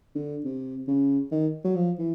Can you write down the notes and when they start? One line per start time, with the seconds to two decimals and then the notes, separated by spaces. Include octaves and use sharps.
0.15 D3
0.44 C3
0.87 C#3
1.32 D#3
1.64 F#3
1.75 F3
1.99 E3